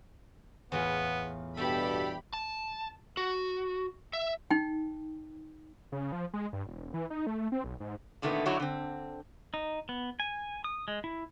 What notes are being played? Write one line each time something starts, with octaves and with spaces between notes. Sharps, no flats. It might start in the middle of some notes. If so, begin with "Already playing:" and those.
E2 A2 B3 F4
G2 B2 G4 A4 E5 B5
A5
F#4
E5
D#4 G5
C#3
F3
G#3
G2
E1
E3
D#4
A3
C4
B1
G#2
A#2 D3 D#3 A3 B3
D3 F#3 D#4 E4 F#4 C#5
D3 C4
D#4
B3
G#5
D#6
G#3
E4